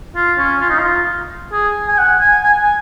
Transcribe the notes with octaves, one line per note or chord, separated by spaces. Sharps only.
F4
C#4
F4
D#4
F4
G#4
G#5
F#5
G#5
G#5
G#5